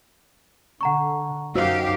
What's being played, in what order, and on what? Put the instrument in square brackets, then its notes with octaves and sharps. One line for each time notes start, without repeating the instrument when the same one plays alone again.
[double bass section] D3 [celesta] F#5 A#5 C#6
[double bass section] F#2 [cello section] D#4 G4 F5 [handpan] F#4 [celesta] C5 E6